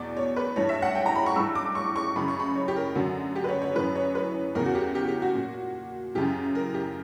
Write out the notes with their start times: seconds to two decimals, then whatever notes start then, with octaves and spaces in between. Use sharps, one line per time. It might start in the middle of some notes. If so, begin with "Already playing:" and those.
Already playing: E2 B2 D5
0.17 C#5
0.36 B4
0.56 G2 E3 C#5
0.69 E5
0.82 F#5
0.95 G5
1.06 A#5
1.16 B5
1.26 C#6
1.36 G2 E3 E6
1.55 D6
1.75 C#6
1.96 C#6
2.16 F#2 C#3 E3 B5
2.28 C#6
2.40 B5
2.55 C#5
2.68 G4
2.76 A#4
2.95 F#2 D3 F#4
3.35 G4
3.44 B4
3.49 C#5
3.62 C#5
3.75 F#2 E3 B4
3.95 C#5
4.15 B4
4.55 E2 C#3 E3 A#4
4.66 F#4
4.75 G4
4.95 G4
5.08 G4
5.22 F#4
5.34 A#2
6.15 F#2 C#3 E3 G4
6.55 A#4
6.74 G4